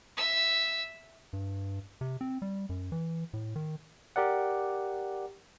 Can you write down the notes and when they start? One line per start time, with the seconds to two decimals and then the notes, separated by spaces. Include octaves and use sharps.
0.17 E5 E6
1.33 G2
2.01 C3
2.21 C4
2.42 G3
2.69 F#2
2.92 E3
3.33 A2
3.56 D#3
4.16 G4 A#4 D5 F#5